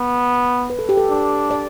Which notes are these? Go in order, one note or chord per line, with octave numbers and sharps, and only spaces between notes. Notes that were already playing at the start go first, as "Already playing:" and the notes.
Already playing: B3
B4
A4
G4
A4
D4
D5